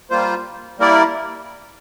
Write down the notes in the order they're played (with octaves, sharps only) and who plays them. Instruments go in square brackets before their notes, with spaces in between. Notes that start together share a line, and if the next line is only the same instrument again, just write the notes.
[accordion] G3 A#3 F4 C5
G3 A#3 E4 A#4 D5